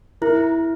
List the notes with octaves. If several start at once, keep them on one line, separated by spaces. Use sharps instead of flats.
E4 A#4